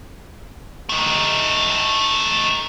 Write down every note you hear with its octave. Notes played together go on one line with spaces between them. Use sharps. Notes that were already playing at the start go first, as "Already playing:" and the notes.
A3 D#4